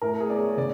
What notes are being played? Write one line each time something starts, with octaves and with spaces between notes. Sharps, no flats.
A2 A#4
G#4
B3 D5
C#5
C#3 D5